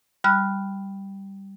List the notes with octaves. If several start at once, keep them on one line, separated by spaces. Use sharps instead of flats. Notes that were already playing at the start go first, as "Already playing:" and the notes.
G3 B5 F6 F#6